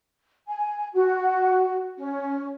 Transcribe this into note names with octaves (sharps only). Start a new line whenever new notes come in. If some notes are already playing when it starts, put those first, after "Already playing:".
G#5
F#4
C#4